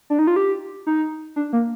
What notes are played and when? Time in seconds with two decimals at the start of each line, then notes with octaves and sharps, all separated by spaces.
0.10 D4
0.19 D#4
0.27 F4
0.36 G4
0.87 D#4
1.36 D4
1.53 A#3